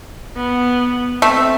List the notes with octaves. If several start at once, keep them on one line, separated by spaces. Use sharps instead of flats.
B3
A3 C4